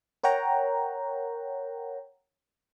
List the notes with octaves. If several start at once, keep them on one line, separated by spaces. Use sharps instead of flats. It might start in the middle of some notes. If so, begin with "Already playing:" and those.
A#4 C#5 F#5 G5 A#5